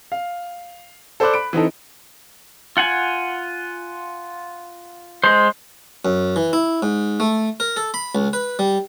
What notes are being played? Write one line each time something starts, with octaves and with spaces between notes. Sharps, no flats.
F5
A4 C5 D5 B5 D6 F#6
B5 D7
E3 C4 D#4 A4
F4 F#5 G#5
G#3 C5
F#2
E3
E4
G#2
A3
A#4
A4
B5
C#2
B4
G3